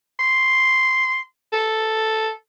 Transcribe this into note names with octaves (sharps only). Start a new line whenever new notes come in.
C6
A4